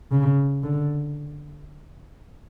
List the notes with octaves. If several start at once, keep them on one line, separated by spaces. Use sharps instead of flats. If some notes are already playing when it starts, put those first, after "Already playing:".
C#3
D3